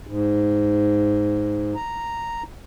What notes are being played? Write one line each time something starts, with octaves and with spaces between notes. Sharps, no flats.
G#2
A#5